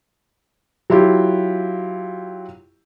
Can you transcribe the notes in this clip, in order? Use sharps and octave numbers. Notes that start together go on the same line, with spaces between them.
F#3 E4 F4 G4